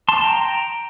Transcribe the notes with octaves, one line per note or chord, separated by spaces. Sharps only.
A5 C6
G5 A#5